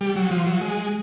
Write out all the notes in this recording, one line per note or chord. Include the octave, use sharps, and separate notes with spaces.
G3
F#3
F3
F#3
G#3